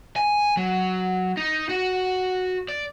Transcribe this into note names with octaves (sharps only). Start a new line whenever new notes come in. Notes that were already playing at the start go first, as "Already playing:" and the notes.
G#5
F#3
D#4
F#4
D5